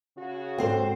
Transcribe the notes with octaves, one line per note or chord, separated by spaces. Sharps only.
C#3 F#4
G#2 C4 A4 C5 F#5